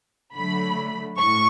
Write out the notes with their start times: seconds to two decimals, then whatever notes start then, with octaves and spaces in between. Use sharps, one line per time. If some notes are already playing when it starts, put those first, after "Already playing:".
0.35 D3 F#3 A3 B5
1.18 A2 C#6